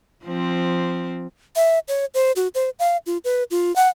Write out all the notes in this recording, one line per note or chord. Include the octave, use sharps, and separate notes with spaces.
F3 C4
E5
C#5
C5
F#4
C5
F5
F4
B4
F4
F#5